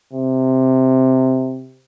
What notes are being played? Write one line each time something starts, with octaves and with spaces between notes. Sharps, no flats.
C3